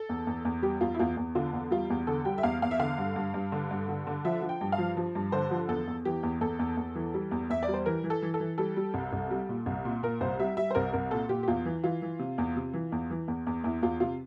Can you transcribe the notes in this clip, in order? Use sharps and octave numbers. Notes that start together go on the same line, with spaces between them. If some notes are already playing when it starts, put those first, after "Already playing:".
Already playing: A4
E2
E2
E2
G3 G4
E2 F4
E4
E2 F4
E2
D3 F4
E2
G3 F4
E2
D3 A4
G3 G5
E5
E2 F5
E2 F5
E5
D3 F5
G2
G2
G2
D3
G2
D3
D3
F3 E5
F3
G5
G2
F5
F3
F3
G2
D3 C5
F3
E2 A4
E2
E3 G4
E2
E2 A4
E2
E2
E3
G3
E2
E2 E5
D5
G3
C5
E3 A#4
E3
A4
E3
A4
E3
G3 A4
G3
C2
C2
G3
A#2
C2
A#2
A#2 A#4
C2 C5
G3 E5
G3 E5
C5
C2 A#4
C2 A#4
A#2 A4
A#2 G4
G4
E2 F4
E3
E3 F4
E3
C3
E2
C3
E3
E2
E3
E2
E2
E2 E4
E2 F4
C3 F4